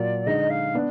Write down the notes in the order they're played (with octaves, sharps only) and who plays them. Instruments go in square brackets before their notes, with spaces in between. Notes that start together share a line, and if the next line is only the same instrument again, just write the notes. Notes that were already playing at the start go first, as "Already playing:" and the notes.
Already playing: [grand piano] A#2 F#3 A#3 F4 [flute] D5
[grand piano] D3 G#3 D#4 [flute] D#5
[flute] F5
[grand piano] B3 D4